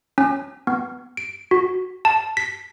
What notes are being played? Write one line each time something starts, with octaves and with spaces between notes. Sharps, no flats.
C#4
B3
D7
F#4
A5
B6